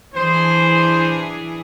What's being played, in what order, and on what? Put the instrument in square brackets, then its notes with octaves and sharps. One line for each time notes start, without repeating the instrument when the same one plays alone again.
[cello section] E3 D4 G#4 [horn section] C5